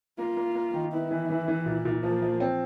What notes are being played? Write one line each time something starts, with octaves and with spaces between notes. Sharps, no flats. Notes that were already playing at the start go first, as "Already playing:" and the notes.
A#3 F4
A#3
A#3
D#3
B3 E4
E3
E3
E3
A#2
A#2
F3 A#3
F3
C4